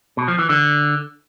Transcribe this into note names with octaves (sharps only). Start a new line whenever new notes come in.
B2
F3
E3
D3